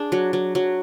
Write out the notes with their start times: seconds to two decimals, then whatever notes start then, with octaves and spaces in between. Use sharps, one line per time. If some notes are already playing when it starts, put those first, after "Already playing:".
Already playing: D4 G#4
0.12 F#3
0.33 F#3
0.55 F#3